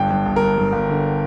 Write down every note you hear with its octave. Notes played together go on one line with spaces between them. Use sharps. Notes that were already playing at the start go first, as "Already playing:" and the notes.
Already playing: G1 G2 G5
G2
G1
A#4
G2
G2
G1
D3